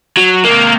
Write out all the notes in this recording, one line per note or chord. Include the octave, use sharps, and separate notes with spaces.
F#3
C3 D#3 G#3 A#3 C4